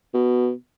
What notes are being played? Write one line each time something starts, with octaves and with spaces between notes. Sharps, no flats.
B2